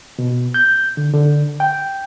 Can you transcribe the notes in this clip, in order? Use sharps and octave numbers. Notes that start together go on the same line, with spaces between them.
B2
G6
D3
D3
G5